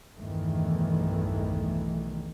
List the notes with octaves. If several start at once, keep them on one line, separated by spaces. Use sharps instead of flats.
B1 E2 G2 D#3 E3 A3